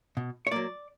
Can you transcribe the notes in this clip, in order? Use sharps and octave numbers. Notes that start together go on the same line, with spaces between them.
B2
C#5
F#3 A#3 D5